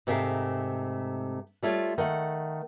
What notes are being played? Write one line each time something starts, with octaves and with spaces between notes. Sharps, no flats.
G#2 C3 A3 A#4 F5
G3 A3 F4 C#5
D#3 A3 F#5